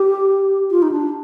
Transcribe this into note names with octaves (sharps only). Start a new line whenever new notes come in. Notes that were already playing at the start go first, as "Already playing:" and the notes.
Already playing: G4
F4
D#4
D4